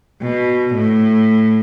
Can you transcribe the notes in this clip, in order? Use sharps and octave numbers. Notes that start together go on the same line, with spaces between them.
B2
A2